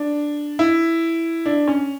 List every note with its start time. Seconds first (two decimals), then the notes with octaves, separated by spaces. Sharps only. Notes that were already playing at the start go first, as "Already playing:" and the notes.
Already playing: D4
0.59 E4
1.46 D4
1.68 C#4